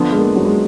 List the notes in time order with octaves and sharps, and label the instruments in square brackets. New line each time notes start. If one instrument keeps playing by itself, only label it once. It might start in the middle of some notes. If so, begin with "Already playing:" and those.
Already playing: [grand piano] D3 F3 B3
[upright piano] G#3
A#3
F#3
G#3